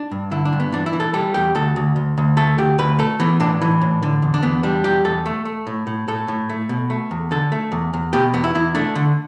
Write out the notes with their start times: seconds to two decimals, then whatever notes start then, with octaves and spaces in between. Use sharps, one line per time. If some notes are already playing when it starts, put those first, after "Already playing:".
Already playing: D4
0.11 G2
0.31 D3 E4
0.45 D4
0.53 G2
0.60 B3
0.72 E3 D4
0.86 E4
0.93 E3
1.00 A4
1.14 G3 A4
1.34 E2 G4
1.55 D2 A4
1.76 D2
1.96 D2
2.18 D2
2.37 A3 A4
2.58 D2 G4
2.78 D2 B4
2.99 A3 A4
3.20 E3 B3
3.40 A2 D4
3.62 E3
3.82 A2
4.03 D3
4.22 E2
4.34 D4
4.42 E2 B3
4.63 G3 D4
4.84 E2 G4
5.05 E2 A4
5.26 A3
5.45 A3
5.67 A2
5.87 A2
6.08 A2 A4
6.28 A2
6.49 A3
6.69 B2
6.90 A3
7.11 E2
7.31 D3 A4
7.52 A3
7.72 E2
7.93 E2
8.13 B2 G4
8.34 E2 B3
8.44 E4
8.55 E2 E4
8.75 A3 D4
8.95 D3